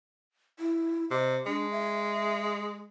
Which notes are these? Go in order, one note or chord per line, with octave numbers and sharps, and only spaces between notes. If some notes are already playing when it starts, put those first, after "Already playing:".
E4
C3 D#5
G#3 D4
E5